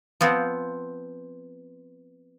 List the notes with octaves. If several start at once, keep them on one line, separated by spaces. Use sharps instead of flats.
F3 B3 C4